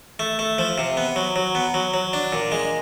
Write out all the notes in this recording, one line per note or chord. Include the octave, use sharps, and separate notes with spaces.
A3
A3
F3
C3
B3
F#3
F#3
B3
F#3
F#3
D4
A#2
G#3